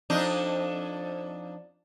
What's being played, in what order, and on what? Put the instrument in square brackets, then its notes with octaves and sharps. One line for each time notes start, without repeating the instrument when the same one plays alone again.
[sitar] F2 D4 D#4